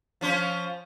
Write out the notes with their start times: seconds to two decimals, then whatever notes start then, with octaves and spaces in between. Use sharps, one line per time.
0.21 F3 C#4 C5